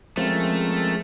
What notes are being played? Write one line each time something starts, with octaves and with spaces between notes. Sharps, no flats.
F3 G#3 A3 C4 C#4 F4 A#4